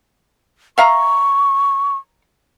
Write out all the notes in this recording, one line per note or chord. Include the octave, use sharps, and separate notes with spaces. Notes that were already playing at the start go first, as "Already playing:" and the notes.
E5 F5 A#5 C#6